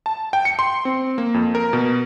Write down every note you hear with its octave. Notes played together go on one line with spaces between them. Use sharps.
A5
G5
C#7
C6
C4
A#3
F2
A#4
B2